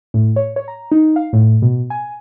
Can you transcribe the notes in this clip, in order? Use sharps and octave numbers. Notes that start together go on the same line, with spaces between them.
A2
C#5
C#5
A#5
D#4
F5
A2
B2
G#5